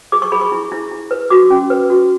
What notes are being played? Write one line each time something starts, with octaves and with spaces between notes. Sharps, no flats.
G#4 D6
C#6
G#4 B5
C#6
E4
E4
E4
B4
F#4 D6
C#4
B4
F#4